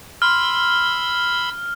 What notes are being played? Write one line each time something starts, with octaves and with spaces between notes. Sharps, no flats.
B5 C6 E6 F6